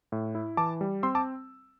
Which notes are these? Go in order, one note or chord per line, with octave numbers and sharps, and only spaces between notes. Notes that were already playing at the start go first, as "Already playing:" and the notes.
A2
E4
E3 A5 D6
G3
C4 C6 E6
A5 D6